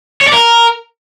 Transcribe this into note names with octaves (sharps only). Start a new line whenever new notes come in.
C#5
D5
A#4